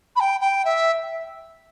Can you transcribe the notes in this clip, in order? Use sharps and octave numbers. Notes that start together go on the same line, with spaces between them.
B5
G5
G5
E5